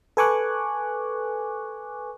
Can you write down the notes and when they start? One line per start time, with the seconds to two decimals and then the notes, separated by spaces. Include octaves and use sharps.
0.17 A4 B4 G#5 C#6 D6 F#6